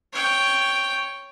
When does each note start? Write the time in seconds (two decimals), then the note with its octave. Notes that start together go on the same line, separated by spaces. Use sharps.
0.12 C#5 G5